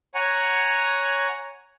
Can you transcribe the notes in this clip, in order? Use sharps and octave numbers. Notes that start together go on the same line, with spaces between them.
C#5 F#5 G#5 A#5